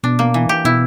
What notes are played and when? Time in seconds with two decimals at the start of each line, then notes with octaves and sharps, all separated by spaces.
0.03 B2 D4
0.19 A#3
0.34 E3
0.49 G4
0.65 B2 E4